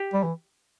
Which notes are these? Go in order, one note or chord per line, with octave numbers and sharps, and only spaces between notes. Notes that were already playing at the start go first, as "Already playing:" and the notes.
Already playing: G4
G3
E3